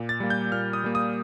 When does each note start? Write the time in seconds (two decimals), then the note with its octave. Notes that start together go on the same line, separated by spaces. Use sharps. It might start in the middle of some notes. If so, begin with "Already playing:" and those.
Already playing: A#2
0.09 A6
0.20 G3 A#3
0.30 G6
0.52 A#2 F6
0.73 D#6
0.84 G3 A#3
0.95 D#6